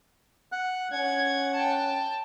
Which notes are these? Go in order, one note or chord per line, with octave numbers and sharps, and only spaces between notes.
F#5 F#6
C#4 F#5 G#6
G5 A5